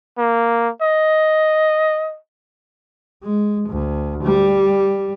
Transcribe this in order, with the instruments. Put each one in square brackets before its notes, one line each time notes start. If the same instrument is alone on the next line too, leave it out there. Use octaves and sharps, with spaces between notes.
[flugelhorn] A#3
D#5
[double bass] G#3
D2
G3